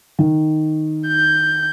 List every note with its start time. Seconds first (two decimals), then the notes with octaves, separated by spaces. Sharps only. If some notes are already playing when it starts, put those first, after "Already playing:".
0.19 D#3
1.08 G6